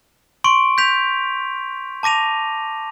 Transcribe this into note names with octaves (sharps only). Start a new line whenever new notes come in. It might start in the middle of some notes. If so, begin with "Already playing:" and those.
C6 C#6 D7
G6 B6 F7
A5 D6 A#6 D#7 F7